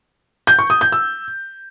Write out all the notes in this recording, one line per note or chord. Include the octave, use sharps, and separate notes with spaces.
G6
C#6
D#6
G6
E6